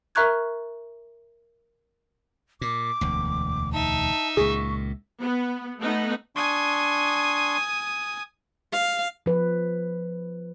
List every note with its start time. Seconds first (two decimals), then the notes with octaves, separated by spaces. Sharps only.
0.15 A#4 E5 A#5 C#6 F#6 G#6
2.61 A#2 D6
3.01 E1 D2
3.73 D#4 E5 A5
4.37 C#2 A#2 G#4 C#6
5.22 B3
5.78 A3 B3 D#4
6.36 D4 G#5 C6 C#6 D#6
8.72 F5
9.26 F3 B4